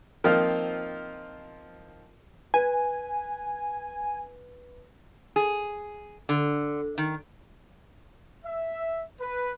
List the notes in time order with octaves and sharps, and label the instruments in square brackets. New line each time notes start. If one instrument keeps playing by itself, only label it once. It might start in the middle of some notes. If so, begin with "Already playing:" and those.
[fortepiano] D#3 F3 A#3 C4 D#4 F4
[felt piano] B4 [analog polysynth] G#5
[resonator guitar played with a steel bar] G#4
D3
D#3
[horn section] E5
B4